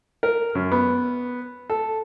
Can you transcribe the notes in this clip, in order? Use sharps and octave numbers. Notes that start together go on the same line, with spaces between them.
A#4
F#2
B3
A4